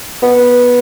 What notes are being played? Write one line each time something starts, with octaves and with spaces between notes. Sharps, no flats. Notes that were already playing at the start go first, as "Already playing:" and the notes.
B3